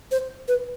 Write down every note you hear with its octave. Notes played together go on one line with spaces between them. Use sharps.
C5
B4